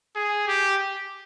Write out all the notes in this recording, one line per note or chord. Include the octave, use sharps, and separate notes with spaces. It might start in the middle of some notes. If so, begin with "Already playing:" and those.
G#4
G4